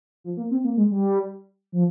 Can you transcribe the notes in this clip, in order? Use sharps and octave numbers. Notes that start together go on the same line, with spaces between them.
F3
A#3
C4
A#3
G#3
G3
F3